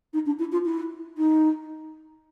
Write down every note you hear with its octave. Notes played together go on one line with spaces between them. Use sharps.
D#4
D4
E4
F4
E4
D#4